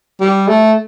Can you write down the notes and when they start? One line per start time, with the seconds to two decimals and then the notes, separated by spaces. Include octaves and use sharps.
0.21 G3
0.48 A3